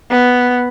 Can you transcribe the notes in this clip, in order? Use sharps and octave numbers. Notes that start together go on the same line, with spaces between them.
B3